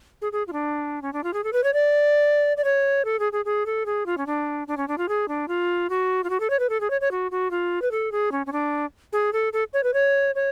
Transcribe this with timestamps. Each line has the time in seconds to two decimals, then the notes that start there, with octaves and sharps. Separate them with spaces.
0.22 G#4
0.32 G#4
0.47 F4
0.53 D4
1.02 C#4
1.13 D4
1.24 F4
1.33 G#4
1.44 A4
1.53 B4
1.64 C#5
1.73 D5
2.57 D5
2.64 C#5
3.05 A4
3.19 G#4
3.33 G#4
3.45 G#4
3.66 A4
3.86 G#4
4.06 F4
4.18 C#4
4.27 D4
4.68 D4
4.77 C#4
4.88 D4
4.98 F4
5.09 G#4
5.28 D4
5.48 F4
5.90 F#4
6.24 F4
6.30 F#4
6.40 A4
6.50 C#5
6.59 B4
6.69 A4
6.81 G#4
6.90 C#5
7.01 C#5
7.11 F#4
7.31 F#4
7.51 F4
7.82 B4
7.91 A4
8.12 G#4
8.32 C#4
8.46 C#4
8.52 D4
9.13 G#4
9.33 A4
9.53 A4
9.73 C#5
9.84 B4
9.94 C#5
10.35 C#5